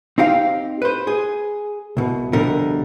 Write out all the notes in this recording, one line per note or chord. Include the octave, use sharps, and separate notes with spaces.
C4 D#4 G4 F5
B4 C5
G#4
C2 B2
C2 B2 D3 F3 G3 A#4